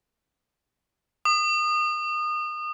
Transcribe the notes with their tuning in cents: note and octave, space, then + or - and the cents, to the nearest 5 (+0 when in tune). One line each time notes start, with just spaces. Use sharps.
D#6 -30